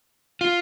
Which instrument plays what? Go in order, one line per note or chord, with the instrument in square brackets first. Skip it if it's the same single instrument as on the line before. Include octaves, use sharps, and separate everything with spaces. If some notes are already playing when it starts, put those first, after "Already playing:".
[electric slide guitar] F4